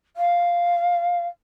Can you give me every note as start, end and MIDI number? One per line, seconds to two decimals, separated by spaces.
0.16 1.26 77